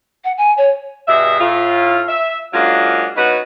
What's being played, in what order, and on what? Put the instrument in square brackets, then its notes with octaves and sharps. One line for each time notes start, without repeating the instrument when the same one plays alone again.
[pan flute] F#5
G#5
C#5
[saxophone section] G2 B2 G#4 E5
A2 F4
E5
F#3 G#3 A#3 C#4 D4 F4
F#3 B3 C#4 D#4 F#4 B4